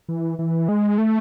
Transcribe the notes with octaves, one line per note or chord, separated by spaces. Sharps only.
E3
E3
G#3
A3